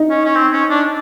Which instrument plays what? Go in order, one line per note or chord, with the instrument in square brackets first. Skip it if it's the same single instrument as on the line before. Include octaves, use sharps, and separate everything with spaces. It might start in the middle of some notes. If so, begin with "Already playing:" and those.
Already playing: [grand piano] D#4
[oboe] C#4
C#4
C4
C#4
D4